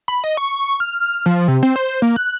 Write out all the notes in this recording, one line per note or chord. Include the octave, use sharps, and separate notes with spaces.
B5
D#5
C#6
F6
F3
C3
C4
C5
A#3
F#6